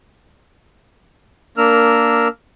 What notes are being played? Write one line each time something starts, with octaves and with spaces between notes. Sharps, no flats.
A#3 D4 A#4 E6 F6